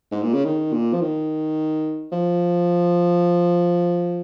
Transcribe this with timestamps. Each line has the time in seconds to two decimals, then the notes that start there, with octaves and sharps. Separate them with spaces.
0.12 G#2
0.23 A#2
0.34 C#3
0.45 D#3
0.73 A#2
0.93 F3
1.01 D#3
2.12 F3